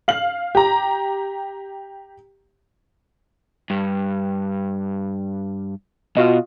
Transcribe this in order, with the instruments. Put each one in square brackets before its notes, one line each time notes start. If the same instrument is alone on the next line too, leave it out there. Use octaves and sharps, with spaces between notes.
[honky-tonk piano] F5 F#7
G4 A#5
[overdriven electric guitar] G2
[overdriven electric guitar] B2 [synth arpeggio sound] F4 F#4 D#5